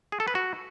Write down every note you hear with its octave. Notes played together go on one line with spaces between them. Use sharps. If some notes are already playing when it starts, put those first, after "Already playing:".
G#4
A4
B4
F#4